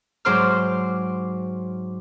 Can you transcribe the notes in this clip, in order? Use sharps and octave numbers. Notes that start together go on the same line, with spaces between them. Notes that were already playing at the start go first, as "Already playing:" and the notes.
G#2 F#3 C5 C6 D6 F6